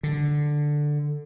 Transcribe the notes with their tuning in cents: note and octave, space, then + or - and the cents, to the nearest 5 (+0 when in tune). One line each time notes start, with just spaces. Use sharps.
D3 +5